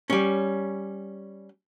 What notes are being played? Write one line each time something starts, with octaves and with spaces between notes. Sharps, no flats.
G3 C#4